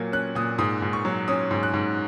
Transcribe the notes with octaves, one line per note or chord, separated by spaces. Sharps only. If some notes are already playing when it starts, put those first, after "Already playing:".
Already playing: A#2 F#3 A#3 G#6
C#4 F#6
A#2 D#6
G#2 D#6
G#2
C#6
F#3
C#4 D#6
G#2
F#6
G#2